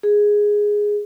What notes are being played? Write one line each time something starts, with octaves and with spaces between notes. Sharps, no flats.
G#4